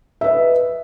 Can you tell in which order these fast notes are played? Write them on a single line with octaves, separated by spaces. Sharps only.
E5 B4 D#5